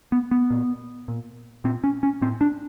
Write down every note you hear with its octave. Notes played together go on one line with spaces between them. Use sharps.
B3
B3
A#2
A#2
A#2 C4
C#4
C#4
A2 C4
D4